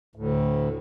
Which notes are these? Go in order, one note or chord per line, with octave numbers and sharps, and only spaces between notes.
D2 A2